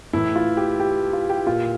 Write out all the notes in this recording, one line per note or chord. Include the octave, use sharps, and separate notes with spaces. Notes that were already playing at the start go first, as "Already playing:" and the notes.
A2 E3 E4
F4
G4
G4
F4
G4
A#2 F4